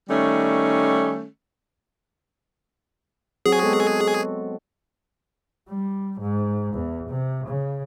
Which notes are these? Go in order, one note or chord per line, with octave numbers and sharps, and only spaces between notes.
D#3 G3 A3 C#4
F#3 C4 F#4 G#4
G#3 B3 A4
G3
G#2
E2
C3
C#3